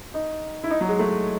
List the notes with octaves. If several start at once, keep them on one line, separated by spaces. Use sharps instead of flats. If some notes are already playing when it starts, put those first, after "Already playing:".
D#4
E4
D#4
F#3
G#3
A3